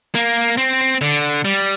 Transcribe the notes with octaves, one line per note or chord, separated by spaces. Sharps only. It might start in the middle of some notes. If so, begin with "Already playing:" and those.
A#3
C4
D3
G3